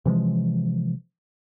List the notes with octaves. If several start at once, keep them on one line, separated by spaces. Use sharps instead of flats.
C3 E3 F3 G#3